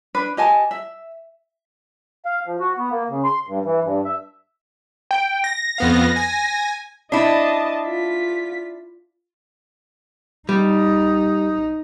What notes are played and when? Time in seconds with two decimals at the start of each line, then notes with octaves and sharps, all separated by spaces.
0.15 D4 B4
0.37 G4 D#5 G#5 A5
0.71 E5
2.25 F5
2.46 F3
2.60 F#4
2.78 B3
2.91 A#3
3.09 C#3
3.24 C6
3.48 G2
3.65 E3
3.84 G2
4.05 E5
5.11 G5
5.44 A#6
5.78 F2 B3 F5
6.16 G#5
7.12 D4 E4 D#5 A5
7.86 F4 B6
10.49 G3 D#4